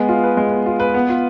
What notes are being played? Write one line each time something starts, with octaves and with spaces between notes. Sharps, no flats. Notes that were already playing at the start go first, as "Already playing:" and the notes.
Already playing: G#3 B3
F4
B4
G#3
B3
F4
B4
B3
F4